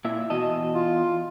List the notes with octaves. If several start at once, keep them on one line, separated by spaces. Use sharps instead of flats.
A#2 E4 E5
E2 B2 D#5 A5
F4